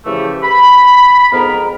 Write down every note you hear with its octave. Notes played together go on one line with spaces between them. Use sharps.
C#3 E3 F3 A3 G4
B5
F2 G#2 B3 A#4 A#5